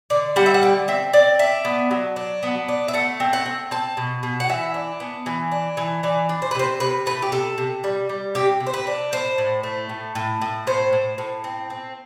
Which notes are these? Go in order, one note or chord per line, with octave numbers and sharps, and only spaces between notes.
D3 D5
G3 F#5
E5
F#5
D3 G5
C4 E5
C4 D5
D4 E5
B3
F#3
D4
B3
D4
E5
A3 F#5
C4
F#5
C4
C4 A5
B2
B2
F#5
E3 E5
D4
B3
E3
D4
E3
E3 D5
D4
C5
B4
C3 C5
C3 B4
A3 B4
G4
C3 A4
C3
G3
G3
C3 G4
C3
C5
B4
D4
A2 C5
A2
A3
A2
A2
A2
A2 C5
A2
A2
C4
C4